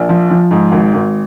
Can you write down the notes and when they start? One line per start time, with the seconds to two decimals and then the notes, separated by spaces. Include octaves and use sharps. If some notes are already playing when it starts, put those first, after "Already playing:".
Already playing: A#1
0.09 F3
0.30 F3
0.51 G#2
0.72 G#1
0.93 G#1